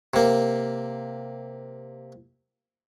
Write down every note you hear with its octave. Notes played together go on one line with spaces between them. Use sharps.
C3 A#3